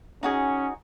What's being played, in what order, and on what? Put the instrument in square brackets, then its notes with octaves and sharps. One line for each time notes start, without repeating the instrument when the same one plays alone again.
[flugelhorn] C#4 [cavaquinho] D#4 F#4 G#4